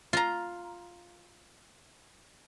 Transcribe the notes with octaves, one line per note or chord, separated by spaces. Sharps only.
F4 A#5